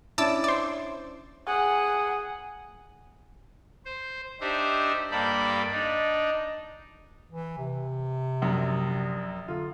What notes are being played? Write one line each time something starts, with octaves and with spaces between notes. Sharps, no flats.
C#4 D4 E4 A5 D6 E6
C5 D5
G#4 F#5
C5
D4 D#4 G4 C5 E5
G2 A#3 A4 D5 G5 B5
D4 D#4
E3
C3
A#1 F#2
D3 F4